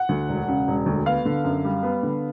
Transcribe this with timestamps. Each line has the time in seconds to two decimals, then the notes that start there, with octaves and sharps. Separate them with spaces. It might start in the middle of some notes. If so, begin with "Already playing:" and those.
Already playing: F#5
0.09 D2
0.29 E1
0.48 C#3
0.68 E1
0.86 D2
1.06 B3 F5
1.25 D3
1.44 F#2
1.65 G3
1.83 B3
2.03 D3